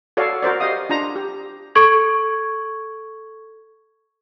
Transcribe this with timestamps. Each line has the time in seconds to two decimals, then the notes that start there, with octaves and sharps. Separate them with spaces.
0.17 F#4 A4 C#5 D5 F5
0.43 F#4 A#4 C5 D5
0.60 G4 D#5 F5 D#6
0.89 D4 F4 A#5
1.16 G4
1.75 A4 C#6 G#6